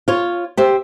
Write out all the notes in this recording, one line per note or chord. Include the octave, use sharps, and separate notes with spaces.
F4 C#5
G4 C5 E5